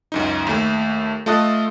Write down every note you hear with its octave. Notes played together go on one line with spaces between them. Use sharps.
C#2 F#2 D#4
D#2 A3
A3 F4 A4 D#5 D#6 F#6